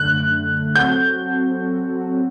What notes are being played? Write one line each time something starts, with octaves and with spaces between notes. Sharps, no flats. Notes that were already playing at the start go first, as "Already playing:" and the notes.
Already playing: F#2 D3 A3 F#6
F#3 C4 F#4 A4 G6